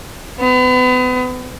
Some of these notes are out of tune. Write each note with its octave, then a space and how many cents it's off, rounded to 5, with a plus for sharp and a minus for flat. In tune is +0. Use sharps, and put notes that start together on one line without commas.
B3 +35